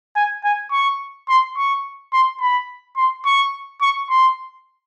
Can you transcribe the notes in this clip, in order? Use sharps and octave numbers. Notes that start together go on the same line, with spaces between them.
G#5
G#5
C#6
C6
C#6
C6
B5
C6
C#6
C#6
C6